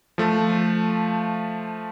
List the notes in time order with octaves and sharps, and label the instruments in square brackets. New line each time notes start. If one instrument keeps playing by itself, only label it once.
[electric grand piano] F3 A3